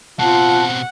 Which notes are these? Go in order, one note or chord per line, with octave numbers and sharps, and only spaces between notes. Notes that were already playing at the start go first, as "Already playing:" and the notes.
B2 C4 F4 F#5 A5